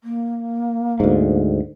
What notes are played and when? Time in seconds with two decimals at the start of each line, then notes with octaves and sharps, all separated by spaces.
0.04 A#3
1.00 D2 G#2